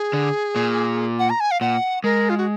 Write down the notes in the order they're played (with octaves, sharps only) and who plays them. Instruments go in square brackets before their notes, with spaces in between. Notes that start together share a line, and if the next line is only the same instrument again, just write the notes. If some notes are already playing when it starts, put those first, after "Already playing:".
Already playing: [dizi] G#4
[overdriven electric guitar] D3
A#2
[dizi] F#5
A#5
G#5
F5
[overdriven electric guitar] A#2 [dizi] F#5
[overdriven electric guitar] G#3 [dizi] A#4
[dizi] F4
F#4